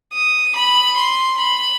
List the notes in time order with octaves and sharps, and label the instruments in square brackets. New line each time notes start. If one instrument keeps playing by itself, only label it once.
[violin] D#6
B5
C6
B5